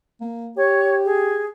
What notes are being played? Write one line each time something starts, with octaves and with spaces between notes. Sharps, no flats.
A#3
G4 C#5
G#4